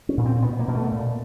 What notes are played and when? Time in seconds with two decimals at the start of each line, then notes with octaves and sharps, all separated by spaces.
0.09 C#4
0.17 A#2
0.26 C4
0.42 B2 B3
0.59 A#3
0.68 B2
0.76 A3
0.92 A#2